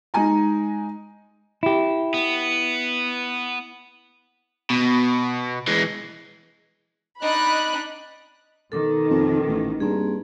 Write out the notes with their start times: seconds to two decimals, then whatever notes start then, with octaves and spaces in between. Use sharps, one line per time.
0.14 G#3 D#4 G#5 A#5
1.63 E4 G4
2.14 B3
4.70 B2
5.67 E3 G#3
7.21 D4 D#4 D#5 B5 F#6
8.72 B2 D#3 A4 D6
9.11 F2
9.47 A1
9.80 G2 A#3 C4 G#4